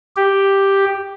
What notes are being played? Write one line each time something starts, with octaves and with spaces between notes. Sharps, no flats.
G4